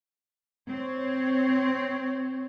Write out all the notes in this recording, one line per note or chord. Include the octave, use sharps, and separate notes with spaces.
C4 C#5